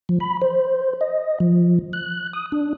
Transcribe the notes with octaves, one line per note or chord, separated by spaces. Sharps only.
F3
B5
C5
D#5
F3
F#6
D#6
D4